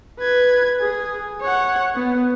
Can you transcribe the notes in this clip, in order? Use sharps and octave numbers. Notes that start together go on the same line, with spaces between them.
B4 G#6
G#4
C#5 F#5
B3